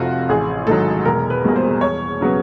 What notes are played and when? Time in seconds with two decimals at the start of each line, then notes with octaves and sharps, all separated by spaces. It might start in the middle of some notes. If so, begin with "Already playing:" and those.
Already playing: F1 F2 C3 F4 F#4
0.29 A1 G#4
0.67 G#2 D#3 F#3 A4
1.05 E1 A#4
1.30 B4
1.44 E2 B2 G3 A#3
1.56 C5
1.81 E1 C#5
2.21 C#3 F#3 B3